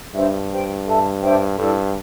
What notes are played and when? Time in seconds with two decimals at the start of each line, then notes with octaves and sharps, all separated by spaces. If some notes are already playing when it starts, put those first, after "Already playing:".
0.15 G2 D4 C5 E5
0.51 G4 C5 G5
0.86 A4 E5 A5
1.22 D4 C5 E5 G5
1.59 G2 E4 A4 D5